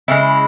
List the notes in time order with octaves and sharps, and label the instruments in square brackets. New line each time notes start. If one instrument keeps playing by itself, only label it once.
[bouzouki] C#3 G#3 E4